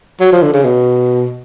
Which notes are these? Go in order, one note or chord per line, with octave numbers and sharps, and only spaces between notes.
F#3
F3
D3
C#3
B2